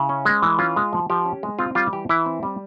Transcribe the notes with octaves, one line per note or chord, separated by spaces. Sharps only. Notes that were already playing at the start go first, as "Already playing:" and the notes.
Already playing: C#3 E4
C#4
G#3
E3
C#4 F4
G#3
F3
F3 G4
C#4
G#3
C4 F4
G3 F4
E3 G4
E3 E4
C4
G3